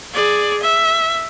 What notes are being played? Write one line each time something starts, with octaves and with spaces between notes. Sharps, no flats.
G#4 D5
E5